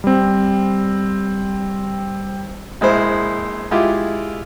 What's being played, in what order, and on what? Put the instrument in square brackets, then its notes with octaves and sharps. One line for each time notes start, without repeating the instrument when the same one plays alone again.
[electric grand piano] G3 C4
[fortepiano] A#1 G#3 E4 C5
G#3 E4 F4 G4